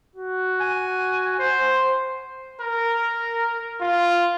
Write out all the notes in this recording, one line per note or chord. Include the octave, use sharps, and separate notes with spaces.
F#4
G#5
C5
A#4
F4